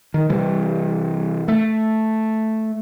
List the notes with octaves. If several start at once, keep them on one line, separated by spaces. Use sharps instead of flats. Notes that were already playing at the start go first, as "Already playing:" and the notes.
D#3
C3 E3 G3
A3